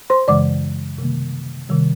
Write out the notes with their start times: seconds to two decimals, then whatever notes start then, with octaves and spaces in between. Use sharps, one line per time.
0.10 C5 C6
0.28 F#2 C#3 E3 G#3 D5 D6
0.98 C3 D#3 G3 A#3
1.69 C3 D#3 G3